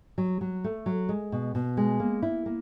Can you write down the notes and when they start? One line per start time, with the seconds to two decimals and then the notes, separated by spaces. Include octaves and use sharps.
0.18 F#3
0.41 F#3
0.64 A3
0.86 F#3
1.09 G#3
1.32 B2
1.55 B2
1.77 G#3
2.00 A#3
2.22 E4
2.46 A#3